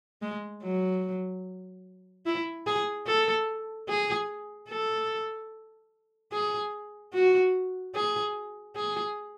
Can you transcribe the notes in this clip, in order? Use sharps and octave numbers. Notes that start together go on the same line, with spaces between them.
G#3
F#3
E4
G#4
A4
G#4
A4
G#4
F#4
G#4
G#4